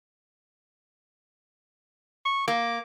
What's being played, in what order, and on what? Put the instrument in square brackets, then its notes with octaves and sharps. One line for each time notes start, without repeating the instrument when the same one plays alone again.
[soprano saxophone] C#6
[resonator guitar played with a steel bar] A#3 [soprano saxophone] D6